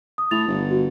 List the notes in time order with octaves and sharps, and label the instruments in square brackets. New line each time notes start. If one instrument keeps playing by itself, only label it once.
[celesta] D#6
[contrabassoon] A2 [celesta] A6 F7
[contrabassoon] G1
[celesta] F#4